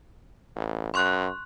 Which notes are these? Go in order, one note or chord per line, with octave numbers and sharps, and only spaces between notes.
A1
F#2 C6 C#6 F#6